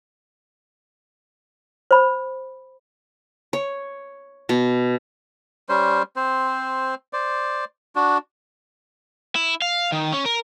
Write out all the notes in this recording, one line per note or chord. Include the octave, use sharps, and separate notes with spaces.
C5 B5
C#5
B2
G3 C#4 C5
C4 C5
C5 D5
D4 F#4
E4
F5
D#3
C#4
A#4